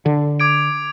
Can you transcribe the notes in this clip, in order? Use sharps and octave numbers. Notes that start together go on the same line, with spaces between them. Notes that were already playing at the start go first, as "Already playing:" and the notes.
D3
D6 G#6 D7